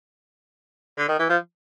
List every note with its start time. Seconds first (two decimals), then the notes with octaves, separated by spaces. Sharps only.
0.98 D3
1.09 D#3
1.19 E3
1.29 F3